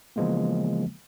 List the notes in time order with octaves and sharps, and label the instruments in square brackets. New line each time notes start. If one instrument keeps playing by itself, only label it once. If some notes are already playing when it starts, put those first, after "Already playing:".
[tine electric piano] C#3 E3 F3 G#3 A#3 B3